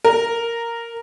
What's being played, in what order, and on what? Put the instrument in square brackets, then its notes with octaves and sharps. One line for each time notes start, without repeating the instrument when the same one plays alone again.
[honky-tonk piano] A#4